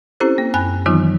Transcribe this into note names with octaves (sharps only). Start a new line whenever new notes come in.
C4 C#4 E4 G4 A4 C5
A#3
F#2 G#5 B5 F#6
D#3 E3 F#3 B3 D#4 F4